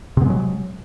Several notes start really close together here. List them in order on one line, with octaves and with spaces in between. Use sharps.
C3 B3 G#3 F#3